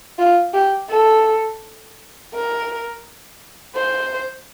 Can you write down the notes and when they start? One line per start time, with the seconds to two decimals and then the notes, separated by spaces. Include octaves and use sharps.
0.18 F4
0.54 G4
0.89 A4
2.33 A#4
3.75 C5